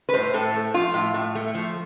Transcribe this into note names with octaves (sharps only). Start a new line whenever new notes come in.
B4
A2 C5
A2 A4
A3
F3 F4
A2
A2
A3
F3